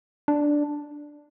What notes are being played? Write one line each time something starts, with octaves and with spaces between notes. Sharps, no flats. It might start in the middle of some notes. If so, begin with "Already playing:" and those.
D4